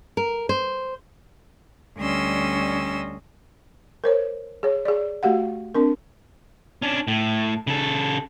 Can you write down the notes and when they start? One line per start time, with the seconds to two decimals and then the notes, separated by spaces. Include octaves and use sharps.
0.17 A#4
0.49 C5
1.97 D2 G3 C#4 D#5 C6 E6
4.04 A#4 C5 C#5
4.63 G#4 C#5
4.85 G#4 D5
5.23 A3 F#4 G4 F5 F#5
5.75 C4 D4 A#4
6.82 C#4 D4
7.08 A2
7.67 C#3 A4